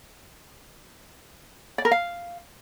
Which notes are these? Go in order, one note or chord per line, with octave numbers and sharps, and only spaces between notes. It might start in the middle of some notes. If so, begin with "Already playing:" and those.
D5
A#4
F5